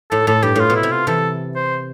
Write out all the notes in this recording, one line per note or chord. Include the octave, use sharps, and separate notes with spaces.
A2 A4
A2 A4
G2 G4
A2 F4
B2
E4
C3
F4
C3 E3 A4
C5